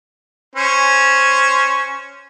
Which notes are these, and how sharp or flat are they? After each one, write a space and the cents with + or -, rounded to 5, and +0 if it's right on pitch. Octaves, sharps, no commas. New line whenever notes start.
C#4 +0 C5 -5